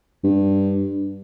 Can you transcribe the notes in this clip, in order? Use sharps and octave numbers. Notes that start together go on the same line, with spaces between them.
G2